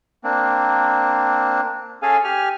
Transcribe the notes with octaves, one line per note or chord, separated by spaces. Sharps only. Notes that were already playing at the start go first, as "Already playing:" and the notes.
A#3 C4 D4
C#4 G#4 A4 F5 G#5
G4 G#5 F6